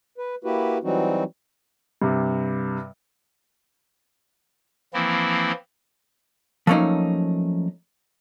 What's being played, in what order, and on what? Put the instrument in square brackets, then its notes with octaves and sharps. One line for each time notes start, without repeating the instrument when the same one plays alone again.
[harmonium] B4
A#3 E4 F#4 G4 B4
E3 F#3 G3 C4 D#4 F#4
[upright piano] G2 C3
[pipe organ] E3 F3 A#3 C4 E4
[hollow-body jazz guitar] F3 F#3 A3 A#3 C#4 D#4